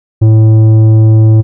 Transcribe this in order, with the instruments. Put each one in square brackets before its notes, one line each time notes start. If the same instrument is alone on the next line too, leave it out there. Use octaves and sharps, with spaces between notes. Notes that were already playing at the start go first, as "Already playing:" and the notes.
[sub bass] A2